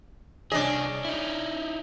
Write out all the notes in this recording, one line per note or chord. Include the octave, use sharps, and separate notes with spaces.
C2 C#4 D4 G#4 D#5
D#4 E4